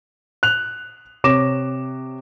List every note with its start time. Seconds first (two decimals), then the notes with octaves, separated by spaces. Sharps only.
0.43 F#6 F7
1.24 C3 C#5 D6 A#6 E7